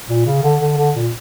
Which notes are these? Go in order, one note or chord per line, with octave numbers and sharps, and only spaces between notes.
A#2
C#3
D3
D3
D3
A#2